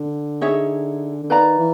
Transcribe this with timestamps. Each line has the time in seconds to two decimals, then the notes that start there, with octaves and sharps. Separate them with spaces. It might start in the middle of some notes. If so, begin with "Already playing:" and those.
Already playing: D3
0.41 D#4 G#4 C#5 E5
1.23 D3
1.30 D#3 B4 D5 F5 A#5
1.59 E3